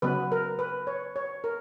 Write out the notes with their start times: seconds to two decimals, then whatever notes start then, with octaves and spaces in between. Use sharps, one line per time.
0.02 C#3 F#3 B3 B4
0.32 A#4
0.59 B4
0.87 C#5
1.16 C#5
1.44 A#4